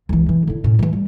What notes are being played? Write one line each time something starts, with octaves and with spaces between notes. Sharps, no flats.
C#2 E3
E3
D3 E4
A2 C#4
D#3 E3
G3